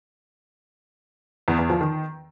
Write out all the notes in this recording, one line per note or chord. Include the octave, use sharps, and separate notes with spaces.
E2
E2
F3
D#3